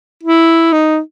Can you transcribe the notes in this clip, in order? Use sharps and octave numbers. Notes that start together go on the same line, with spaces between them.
E4
D#4